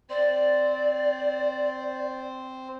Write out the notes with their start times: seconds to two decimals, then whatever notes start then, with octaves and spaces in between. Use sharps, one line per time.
0.10 C4 C5 D5